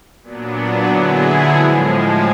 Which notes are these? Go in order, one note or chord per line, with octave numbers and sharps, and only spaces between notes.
A#2 F#3 B3 D4
D3 F#3 B3 E4 G#4
A2 F3 G#3